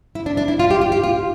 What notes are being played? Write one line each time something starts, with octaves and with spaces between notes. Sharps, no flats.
E4
D4
D4
E4
F4
G4
F4
G4
F4